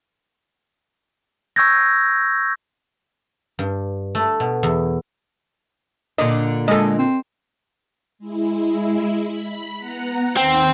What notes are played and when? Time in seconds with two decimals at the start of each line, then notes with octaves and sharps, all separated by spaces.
1.56 C#6 E6 G6 G#6 A#6
3.59 G2
4.15 A3
4.40 B2
4.63 E2
6.18 A#2 D3 D4 D#5
6.68 G#3 A4 D#5
6.99 C4
8.19 G#3 E4
9.24 B5
9.77 B3 F#5 A#5
10.36 D#2 D#3 C4 A#6